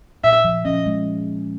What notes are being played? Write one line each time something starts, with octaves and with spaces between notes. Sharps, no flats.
A#2 E5
F3
C#4 D#5
G#3